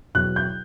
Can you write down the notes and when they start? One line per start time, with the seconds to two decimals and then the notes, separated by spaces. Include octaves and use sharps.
0.15 E2 B2 F#3 F#6
0.36 G6